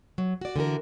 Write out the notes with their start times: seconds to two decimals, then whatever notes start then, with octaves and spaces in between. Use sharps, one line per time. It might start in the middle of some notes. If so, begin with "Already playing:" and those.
0.18 F#3
0.41 F#4 D5
0.56 D3 E3 F#4 A#4